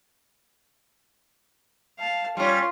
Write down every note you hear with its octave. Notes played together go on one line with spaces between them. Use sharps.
F5 A5
G3 C#4 F4